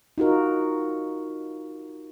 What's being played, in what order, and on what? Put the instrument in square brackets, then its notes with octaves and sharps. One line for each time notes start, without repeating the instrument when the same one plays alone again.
[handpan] D#4 F4 F#4 A#4